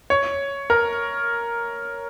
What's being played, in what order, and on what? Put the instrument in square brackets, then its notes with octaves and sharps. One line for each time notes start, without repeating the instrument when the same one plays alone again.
[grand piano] C#5
A#4